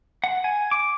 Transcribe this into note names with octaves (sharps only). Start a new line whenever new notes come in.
F#5
G#5
D6